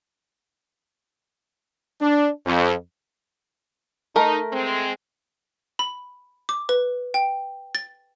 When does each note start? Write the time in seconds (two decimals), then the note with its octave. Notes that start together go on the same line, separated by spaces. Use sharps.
2.01 D4
2.46 F2
4.16 A3 D#4 A#4
4.53 G#3 C4
5.79 B5
6.49 D6
6.69 B4
7.14 G5
7.75 A6